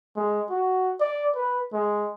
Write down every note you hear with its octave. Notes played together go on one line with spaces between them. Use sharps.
G#3
F#4
D5
B4
G#3